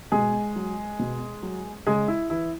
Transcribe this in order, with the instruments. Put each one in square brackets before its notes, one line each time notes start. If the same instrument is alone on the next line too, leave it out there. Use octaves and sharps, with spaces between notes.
[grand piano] B2 G#3 G#4
F#3
B2
F#3
C#3 G#3 G#4
E4
E3 E4